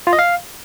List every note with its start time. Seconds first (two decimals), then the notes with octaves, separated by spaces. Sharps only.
0.07 F4
0.13 D#5
0.19 F5